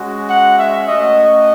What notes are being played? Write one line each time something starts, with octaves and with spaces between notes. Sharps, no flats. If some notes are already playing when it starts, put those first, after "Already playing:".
Already playing: G#3 C#4 F#4
F#5
E5
A3 C#4 F#4 D#5